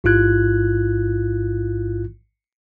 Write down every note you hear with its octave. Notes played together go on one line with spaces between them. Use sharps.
A1 G#2 E4 F4 F#6 G#6